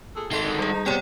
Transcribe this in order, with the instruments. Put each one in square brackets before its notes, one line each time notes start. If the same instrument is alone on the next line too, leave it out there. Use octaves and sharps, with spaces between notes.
[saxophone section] A#2 G#4 A4
[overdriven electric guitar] D#3 G#3 [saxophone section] A3 [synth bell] A4 C6 C7
[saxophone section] D3 D#4
[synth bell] G3 G#4
[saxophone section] D#4
[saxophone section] C3 [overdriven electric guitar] B3 C#4 [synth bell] C#5 D5 G5